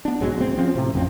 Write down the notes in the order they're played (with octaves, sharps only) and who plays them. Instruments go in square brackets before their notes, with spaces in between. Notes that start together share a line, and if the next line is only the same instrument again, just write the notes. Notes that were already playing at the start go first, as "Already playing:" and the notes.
[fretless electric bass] B3 D4
B1 G#2 F#3 G#3
D2 C4
F3 C4 C#4
A2 C3
A1 F2 C#3 C4